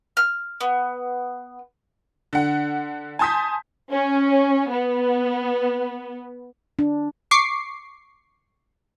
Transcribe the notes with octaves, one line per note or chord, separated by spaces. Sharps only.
F6
B3
D3 F#5
G#5 A5 C6 D#6 G6 B6
C#4
B3
D4
C#6 D6 C7